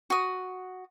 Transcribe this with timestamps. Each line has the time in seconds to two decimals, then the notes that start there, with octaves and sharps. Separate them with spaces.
0.10 F#4 D#6